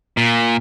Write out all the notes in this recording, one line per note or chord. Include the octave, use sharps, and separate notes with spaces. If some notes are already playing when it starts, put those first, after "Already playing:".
A#2